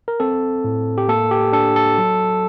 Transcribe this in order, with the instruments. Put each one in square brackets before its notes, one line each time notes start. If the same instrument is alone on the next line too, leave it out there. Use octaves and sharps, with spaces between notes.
[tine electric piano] A#4
C4 A4
A2
G4
A#3 A4
G4
D4 A4
A4
F#3